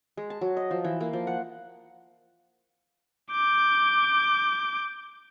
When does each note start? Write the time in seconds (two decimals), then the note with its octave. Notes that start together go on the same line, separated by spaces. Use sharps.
0.17 G#3
0.30 A5
0.41 F#3
0.57 D#5
0.71 F3
0.84 E3
1.00 A#3
1.13 F3
1.27 F#5
3.32 D6 G6